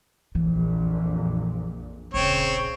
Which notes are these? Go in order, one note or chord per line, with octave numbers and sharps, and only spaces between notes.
A#1 F2 A#2 E3
D#1 A#1 C#3 C4 C#5